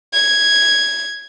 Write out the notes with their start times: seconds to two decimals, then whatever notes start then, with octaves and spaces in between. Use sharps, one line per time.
0.13 G#6